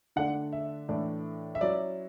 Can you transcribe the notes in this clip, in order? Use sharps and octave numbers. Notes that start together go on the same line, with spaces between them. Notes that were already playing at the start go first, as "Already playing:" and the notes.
D3 A3 D4 F#5
E5
A2 E3 A3 D4
E5
F#3 C#4 E4 D5